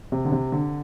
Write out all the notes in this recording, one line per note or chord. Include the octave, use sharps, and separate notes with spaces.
C3
D3
C3
D3